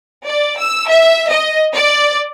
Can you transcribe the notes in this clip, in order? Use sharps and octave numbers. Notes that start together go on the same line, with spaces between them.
D5
E6
E5
D#5
D5